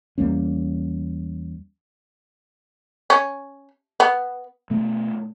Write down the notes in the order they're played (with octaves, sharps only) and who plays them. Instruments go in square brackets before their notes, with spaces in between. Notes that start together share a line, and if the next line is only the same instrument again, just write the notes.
[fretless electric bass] E2 G3 A#3 C#4
[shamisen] C#4
B3
[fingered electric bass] B2 A3 B3